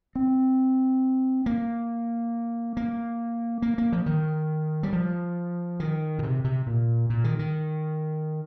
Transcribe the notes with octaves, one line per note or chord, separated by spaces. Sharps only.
C4
A#3
A#3
A#3
A#3
F3
D#3
G3
F3
D#3
A#2
C3
C3
A#2
A#2
D#3
D#3